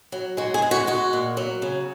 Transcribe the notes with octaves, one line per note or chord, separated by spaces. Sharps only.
F#3
G#3 F#4
G#4
G#3
F#4
G#3 F#4
A#2
F#3
C#3